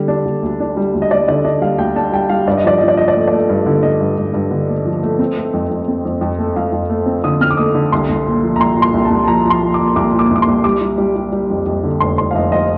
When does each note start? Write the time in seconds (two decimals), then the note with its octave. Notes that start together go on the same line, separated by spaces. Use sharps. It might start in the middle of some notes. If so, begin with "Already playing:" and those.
Already playing: D3 G3
0.08 D4
0.26 D3
0.43 D2
0.60 D4
0.77 G3
0.93 D2
1.02 D#5
1.11 G3 D5
1.28 D3 D5
1.45 D4 D#5
1.61 G3 F5
1.78 D2 G5
1.96 D4 A5
2.12 G3 G5
2.29 G3 F5
2.47 G2 D5
2.57 D#5
2.64 F3 D5
2.78 F3 D#5
2.88 D5
2.97 F3 D#5
3.08 D5
3.16 A3 D#5
3.28 D5
3.33 A3
3.49 G2
3.66 D3
3.83 D3 D#5
4.00 G2
4.18 G2
4.34 G2
4.51 D3
4.69 A3
4.85 F3
5.03 A3
5.19 C4
5.37 A3
5.53 F2
5.70 F2
5.88 C4
6.05 F2
6.21 F2
6.39 A3
6.56 F2 F5
6.72 F2
6.90 A3
7.06 C4
7.24 D3 D#6
7.40 C4 F6
7.51 D6
7.57 A3 D#6
7.75 D3
7.92 C2 C6
8.09 C2
8.26 A#2
8.43 F3
8.56 A#5
8.60 C2 C6
8.77 A#2
8.82 C6
8.94 C2
9.05 A5
9.11 C2
9.24 A5
9.28 F3 A#5
9.45 F3
9.50 C6
9.63 F3
9.74 D6
9.79 A#2
9.96 C2 D6
10.13 A#2
10.19 D6
10.31 C2 D6
10.42 C6
10.48 C2
10.64 G3 D6
10.81 G3
10.98 G3
11.16 G3
11.32 G3
11.50 F2
11.66 F2
11.84 D3
12.00 F1 C6
12.18 F1 C6
12.31 F5
12.35 F1 D#5
12.51 F2 D#5